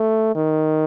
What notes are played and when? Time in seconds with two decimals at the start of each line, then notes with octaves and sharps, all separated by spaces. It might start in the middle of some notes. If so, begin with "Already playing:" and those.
Already playing: A3
0.35 D#3